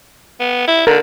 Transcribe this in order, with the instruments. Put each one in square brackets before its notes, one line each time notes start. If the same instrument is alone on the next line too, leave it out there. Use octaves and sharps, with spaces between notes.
[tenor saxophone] B3
E4
[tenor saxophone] D3 [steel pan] A#4